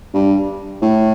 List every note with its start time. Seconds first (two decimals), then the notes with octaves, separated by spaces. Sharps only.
0.14 G2
0.82 A2